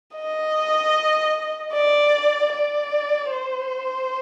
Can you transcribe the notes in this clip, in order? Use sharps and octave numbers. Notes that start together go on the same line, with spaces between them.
D#5
D5
D5
C5